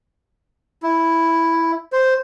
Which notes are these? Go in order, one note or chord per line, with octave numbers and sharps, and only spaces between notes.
E4
C5